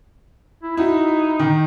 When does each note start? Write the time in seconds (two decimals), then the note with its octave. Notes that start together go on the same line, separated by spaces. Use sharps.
0.63 E4
0.77 D#4 E4 F#4
1.40 D#3